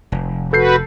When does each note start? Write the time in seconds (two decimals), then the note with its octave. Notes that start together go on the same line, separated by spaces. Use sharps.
0.12 F1
0.53 F#4 A4 B4 G6 C7